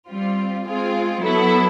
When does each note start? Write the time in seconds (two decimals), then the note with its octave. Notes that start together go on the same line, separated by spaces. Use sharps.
0.10 G3 C4 F4
0.67 G#3 C4 F4 G#4
1.23 F#3 B3 E4 A4